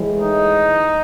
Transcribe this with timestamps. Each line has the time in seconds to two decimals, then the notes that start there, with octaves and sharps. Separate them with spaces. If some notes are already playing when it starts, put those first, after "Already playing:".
Already playing: A2 E3 G#3
0.19 D#4